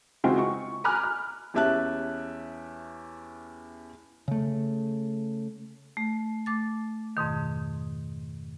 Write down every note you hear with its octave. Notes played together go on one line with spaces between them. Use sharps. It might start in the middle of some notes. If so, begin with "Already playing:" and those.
C#3 E3 G#3 C4 F4 F#4
C#6
G#5 A#5 B5 D6 F6 F#6
F6
E2 C#4 G4 E5 A5 F#6
C#3 A3
A3
A3 D6 A6
F2 G#2 B2 D#3